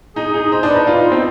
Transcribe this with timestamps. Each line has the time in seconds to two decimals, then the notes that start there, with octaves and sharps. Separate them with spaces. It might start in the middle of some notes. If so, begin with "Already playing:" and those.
0.15 D#4 G#4
0.34 D#4 G#4
0.52 D#4 C5
0.63 D4
0.70 B4
0.75 D#4
0.87 F4 B4
1.00 D#4
1.06 C5
1.11 C4